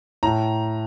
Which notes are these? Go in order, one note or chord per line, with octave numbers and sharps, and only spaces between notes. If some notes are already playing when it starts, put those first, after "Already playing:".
A2 A#5